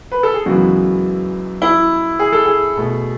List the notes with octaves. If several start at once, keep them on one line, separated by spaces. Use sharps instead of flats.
B4
A4
G#4
F#2 C#3 E3 G#3 B3 F#4
E4
G#4
A4
G#4
B2 A3